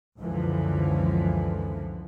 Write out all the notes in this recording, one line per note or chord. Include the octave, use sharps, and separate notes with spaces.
C#2 F#2 D3 E3 F3